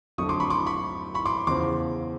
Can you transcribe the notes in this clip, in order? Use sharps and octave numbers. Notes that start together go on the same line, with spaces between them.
F2 D3 F#3 A3 C#6 D#6
C6 D6
B5 C#6
C6 D6
B5 C#6
B5 C#6
C6 D6
E2 C#3 F3 C6 D6